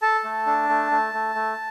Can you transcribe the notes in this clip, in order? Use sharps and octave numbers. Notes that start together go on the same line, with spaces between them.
A4 A5
A3
D4
A3
A3
A3
A3